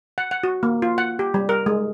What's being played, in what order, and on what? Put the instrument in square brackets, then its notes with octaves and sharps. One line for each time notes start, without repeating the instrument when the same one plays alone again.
[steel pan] F#5
F#5
F#4
A#3
F4
F#5
G4
G3
A#4
G#3